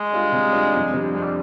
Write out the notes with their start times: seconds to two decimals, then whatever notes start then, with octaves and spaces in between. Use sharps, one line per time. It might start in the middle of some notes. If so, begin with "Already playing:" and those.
Already playing: G#3
0.12 G3 D4 F4
0.32 C3
0.52 G3 D4 F4
0.73 F2
0.93 C3 G3 D4
1.14 F2 G#3
1.23 G3